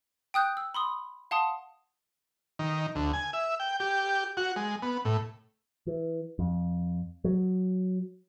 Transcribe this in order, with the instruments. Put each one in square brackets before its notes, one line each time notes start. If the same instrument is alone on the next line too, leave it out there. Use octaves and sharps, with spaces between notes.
[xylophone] G5 D#6 F#6 G6
E6
B5 C6 D#6
F5 F#5 A5 C6 D#6
[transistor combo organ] D#3
D2
G#5
E5
G5
G4
F#4
G#3
B3
A2
[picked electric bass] E3
F2
F#3